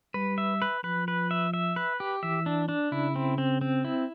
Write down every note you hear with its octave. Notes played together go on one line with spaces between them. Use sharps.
G3 B4
E5
B4
F3 B4
B4
E5
E5
B4
G4
E3 E5
D4
D4
C#3 E4
C4
C4
C4
E4